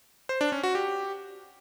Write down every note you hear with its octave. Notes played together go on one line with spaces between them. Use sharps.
C5
D4
C#4
F#4
G4